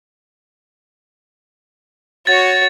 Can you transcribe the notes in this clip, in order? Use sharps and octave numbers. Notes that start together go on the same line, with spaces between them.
F#4 C#5 A6